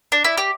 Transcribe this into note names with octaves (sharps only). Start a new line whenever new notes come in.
D4
E4
G4